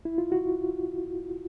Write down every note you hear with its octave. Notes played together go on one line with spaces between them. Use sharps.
E4
F4
F#4